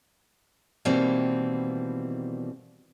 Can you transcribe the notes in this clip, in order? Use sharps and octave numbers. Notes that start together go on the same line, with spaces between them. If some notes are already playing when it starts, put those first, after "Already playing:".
B2 D#3 E3 G3 A#3 C4